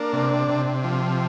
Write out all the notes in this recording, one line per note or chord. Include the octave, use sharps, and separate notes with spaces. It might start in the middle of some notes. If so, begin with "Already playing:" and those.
Already playing: A#3 D4
C3
C3
F3